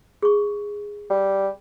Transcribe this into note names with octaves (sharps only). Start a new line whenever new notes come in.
G#4 C#6
G3